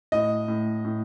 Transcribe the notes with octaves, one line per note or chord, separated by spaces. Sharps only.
A2 D#5
A2
A2